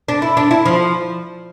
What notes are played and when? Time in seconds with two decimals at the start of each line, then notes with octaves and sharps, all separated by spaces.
0.08 D4
0.22 E4
0.37 D4
0.51 E4
0.65 F3